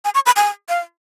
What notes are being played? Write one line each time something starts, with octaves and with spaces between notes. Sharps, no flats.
G#5
C#6
B5
G#5
F5